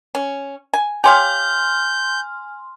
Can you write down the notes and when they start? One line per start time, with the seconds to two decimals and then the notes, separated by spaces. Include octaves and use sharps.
0.15 C#4
0.73 G#5
1.04 G4 C#5 F5 G#5 C6 F6 G6